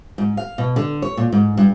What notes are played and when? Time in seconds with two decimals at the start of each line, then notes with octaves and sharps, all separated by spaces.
0.18 G#2
0.37 F5
0.58 B2
0.76 D3
1.02 C#5
1.17 A#2
1.32 G#2
1.57 G2